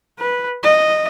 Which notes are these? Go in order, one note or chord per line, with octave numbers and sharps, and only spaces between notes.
B4
D#5